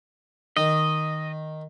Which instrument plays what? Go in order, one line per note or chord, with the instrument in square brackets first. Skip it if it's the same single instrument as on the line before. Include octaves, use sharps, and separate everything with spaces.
[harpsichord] D#3 [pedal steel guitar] D#5